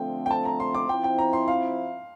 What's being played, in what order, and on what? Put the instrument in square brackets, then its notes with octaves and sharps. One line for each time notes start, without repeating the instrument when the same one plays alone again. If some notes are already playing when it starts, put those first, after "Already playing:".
Already playing: [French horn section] D3 F3 A3 C4 [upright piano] G5
[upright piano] G5
A5
A#5
C6
D6
[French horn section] F3 C4 E4 [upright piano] G5
[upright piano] G5
A#5
C6
F5